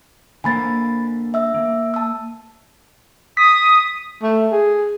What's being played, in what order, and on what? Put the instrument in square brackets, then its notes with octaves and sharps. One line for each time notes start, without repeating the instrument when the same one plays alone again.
[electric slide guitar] D3 A#3 C5 [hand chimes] G#5 B5 A6
[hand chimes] E5 E6
[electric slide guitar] A#3
[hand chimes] A5 E6
[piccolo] D#6 [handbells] B6
[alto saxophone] A3
G#4